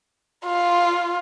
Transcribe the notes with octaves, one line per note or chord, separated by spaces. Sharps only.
F4